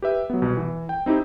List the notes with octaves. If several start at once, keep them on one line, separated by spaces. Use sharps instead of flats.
G4 B4 E5
F#3 B3
C2 B2
E3
G5
C4 D#4 E4 G4